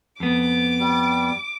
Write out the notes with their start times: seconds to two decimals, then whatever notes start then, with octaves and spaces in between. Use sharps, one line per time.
0.20 F2 B3 D6
0.80 G3